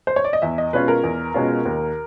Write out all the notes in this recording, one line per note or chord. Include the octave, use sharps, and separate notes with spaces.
C5
C#5
D5
D#5
E2 E5
D#5
B2 G#3 C#4 F4 B4
A#4
E2
B2 G#3 C#4 F4
D#2